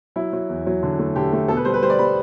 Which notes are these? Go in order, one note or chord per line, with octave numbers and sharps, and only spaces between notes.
F#3 E4
F#3
E2
F#3
D3
A3
D3 G4
A3
B2 A4
B4
G3 C5
B4
G3 C5
D5
G3 B5